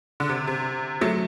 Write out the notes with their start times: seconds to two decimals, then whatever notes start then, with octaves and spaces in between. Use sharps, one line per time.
0.20 D3
0.29 C3
0.47 C3
1.01 F#3 A3